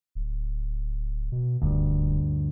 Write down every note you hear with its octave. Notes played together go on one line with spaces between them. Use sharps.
D1
B2
D#1 D2 G2